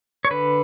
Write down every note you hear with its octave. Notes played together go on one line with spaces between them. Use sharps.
C#5
D3 B4